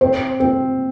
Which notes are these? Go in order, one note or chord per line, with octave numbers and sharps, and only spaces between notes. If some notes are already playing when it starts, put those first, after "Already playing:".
C4 C5
C4